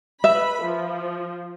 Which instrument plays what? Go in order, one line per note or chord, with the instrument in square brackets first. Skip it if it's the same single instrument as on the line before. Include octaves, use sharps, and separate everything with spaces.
[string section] B4 B5 [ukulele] E5
[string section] F3